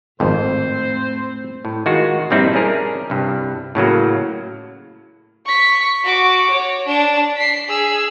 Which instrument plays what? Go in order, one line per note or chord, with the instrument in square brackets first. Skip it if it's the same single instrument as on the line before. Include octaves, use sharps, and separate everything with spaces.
[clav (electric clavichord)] G#1 F2 [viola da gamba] A2 A3 C4 [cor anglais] C5
[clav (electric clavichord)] A2
D#3 G#3 F4 F#4
A#1 G2 G3 C4 D#4 E4
C#4 D4 G#4 A#4
C2 G2
A2 C#3 F#3 A#3
[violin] C#6 B6
F#4 D6
C#5
D4 E7
B6 C7
G#4 E6